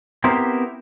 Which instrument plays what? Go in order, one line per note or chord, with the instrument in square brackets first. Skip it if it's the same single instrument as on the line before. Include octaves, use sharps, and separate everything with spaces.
[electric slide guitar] B3 C4 E4 G4 A#4 C5